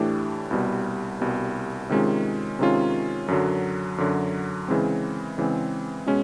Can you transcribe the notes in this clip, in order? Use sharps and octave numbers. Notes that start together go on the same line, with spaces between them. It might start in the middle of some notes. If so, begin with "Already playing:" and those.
Already playing: A2 E3 A3 D4 G4
C2 B2 G3
C2 B2 G3
C3 D#3 G#3 C#4 F4
C3 D#3 G#3 C#4 F4
F#2 D3 F#3
F#2 D3 F#3
C#3 E3 G#3 C4
C#3 E3 G#3 C4
B2 G#3 C#4